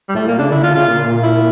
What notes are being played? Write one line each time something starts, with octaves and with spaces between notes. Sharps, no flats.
G3
A2 A3
A#2 A#3
C#3 D4
D3 E4
F4
C#3 F4
A#2
E4